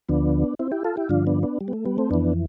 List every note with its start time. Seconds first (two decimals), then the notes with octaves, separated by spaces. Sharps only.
0.09 D2 D3 F3 B3 D4
0.59 C4 E4
0.72 E4 G4
0.84 F4 A4
0.97 E4 G4
1.09 G2 D3 F3 D4 F4
1.27 B3 D4
1.43 B3 D4
1.61 G3
1.68 B3
1.73 A3
1.85 G3 B3
1.98 A3 C4
2.11 F2 E3 B3 D4